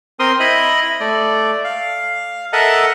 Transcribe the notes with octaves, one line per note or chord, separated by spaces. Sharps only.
C4 A#4 C6 D#6
E4 D#5 B5
A3 D5
F5
A4 A#4 D#5 E5 F#5 A5